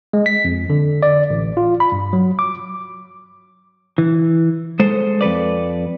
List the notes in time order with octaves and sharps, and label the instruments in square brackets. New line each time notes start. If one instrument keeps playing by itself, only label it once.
[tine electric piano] G#3
B6
F2
D3
D5
A1
F4
B5
G2
F#3
D6
[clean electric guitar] E3
G#3 A4 C5
F2 A4 B4 D5